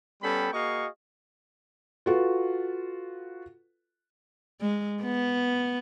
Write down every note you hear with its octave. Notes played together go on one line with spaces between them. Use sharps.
G3 B3 C#4 A4 G5 B5
A#3 F#4 G#4 D#5 F5 C#6
F4 F#4 A4 B4
G#3
B3